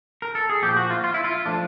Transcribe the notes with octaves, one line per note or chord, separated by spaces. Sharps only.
A#4
A4
G#4
A#2 F3 A#3 G4
F#4
F4
F4
E4
F4
F3 A3 D4